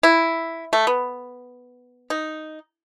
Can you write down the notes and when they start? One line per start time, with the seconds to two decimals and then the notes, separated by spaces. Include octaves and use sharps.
0.03 E4
0.73 A3
0.87 B3
2.10 D#4